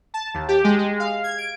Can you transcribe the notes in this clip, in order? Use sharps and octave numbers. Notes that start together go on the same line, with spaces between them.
A5
D#2
G4
G#3
G#3
F5
G#6
D7